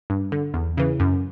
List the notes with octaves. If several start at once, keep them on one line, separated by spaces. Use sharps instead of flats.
G2
D3
E2
C#3 E3
F#2